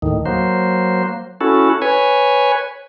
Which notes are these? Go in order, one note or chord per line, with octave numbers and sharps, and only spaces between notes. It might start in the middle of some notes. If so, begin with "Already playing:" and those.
D#2 A2 D#3
F#3 A#3 C5
C#4 E4 F#4 A4
B4 C#5 G#5